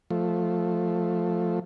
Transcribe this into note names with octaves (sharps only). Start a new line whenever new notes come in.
F3 A3